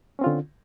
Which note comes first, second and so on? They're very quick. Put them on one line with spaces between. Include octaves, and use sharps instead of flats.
C#4 C4 F4 D3